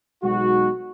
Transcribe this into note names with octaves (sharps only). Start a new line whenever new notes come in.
B1 B2 G#3 D#4 F#4